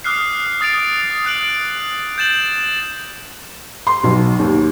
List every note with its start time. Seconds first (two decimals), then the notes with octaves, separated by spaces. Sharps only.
0.04 D6 D#6 F6 F#6 C7
0.61 D#6 A6 C7 D7 F7
1.25 D#6 F#6 D7 F#7
2.18 G6 A6 E7 F#7
3.87 C6
4.04 B1
4.39 D#2